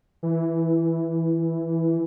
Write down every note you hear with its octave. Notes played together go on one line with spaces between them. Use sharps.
E3